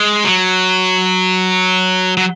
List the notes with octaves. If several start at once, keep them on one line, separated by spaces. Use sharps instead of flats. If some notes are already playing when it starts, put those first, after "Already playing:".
Already playing: G#3
F#3
F#3